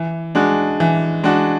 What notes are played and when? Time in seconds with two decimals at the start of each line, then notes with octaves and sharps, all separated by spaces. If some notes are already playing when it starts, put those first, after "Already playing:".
Already playing: E3
0.35 G#3 D4 F#4
0.80 E3
1.23 G#3 D4 F#4